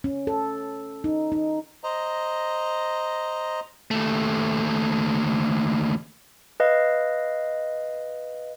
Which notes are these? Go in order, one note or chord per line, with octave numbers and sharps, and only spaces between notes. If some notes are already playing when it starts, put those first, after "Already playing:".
C#4
A4
D#4
D#4
C5 D#5 A#5
D#2 A3
B4 D#5 F5